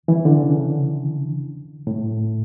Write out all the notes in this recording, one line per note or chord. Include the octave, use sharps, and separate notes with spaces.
E3
D3
C#3
A2